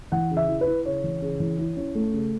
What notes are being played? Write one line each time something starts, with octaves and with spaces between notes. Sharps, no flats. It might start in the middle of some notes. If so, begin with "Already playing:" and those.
E3 F#5
C#3
E5
E4
B4
E4
C#3 C#5
E3
C#3
E3
E4
C#4
A3
C#3